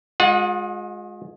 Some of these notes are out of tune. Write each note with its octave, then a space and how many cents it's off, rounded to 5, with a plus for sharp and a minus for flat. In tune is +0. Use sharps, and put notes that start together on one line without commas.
G#3 +0 F4 +40 F#5 -25